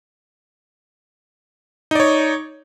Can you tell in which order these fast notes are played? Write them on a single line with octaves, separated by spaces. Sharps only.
D#4 D5 C#5